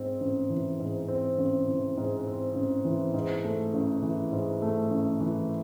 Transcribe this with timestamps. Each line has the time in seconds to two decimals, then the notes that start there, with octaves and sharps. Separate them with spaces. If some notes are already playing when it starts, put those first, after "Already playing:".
Already playing: G#2 C4
0.21 A1
0.50 E3
0.79 G#2
1.08 C4
1.38 A1
1.68 E3
1.97 G#2
2.27 C4
2.55 A1
2.85 E3
3.14 G#2
3.44 A3
3.74 A1
4.03 E3
4.32 G#2
4.62 A3
4.91 A1
5.20 E3